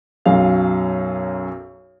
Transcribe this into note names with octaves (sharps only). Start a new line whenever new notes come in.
B1 F#2 G#4 F5